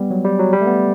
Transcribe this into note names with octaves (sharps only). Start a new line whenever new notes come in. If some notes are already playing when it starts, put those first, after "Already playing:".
Already playing: G3 B3
F#3
G3
F#3
G3
A3
B3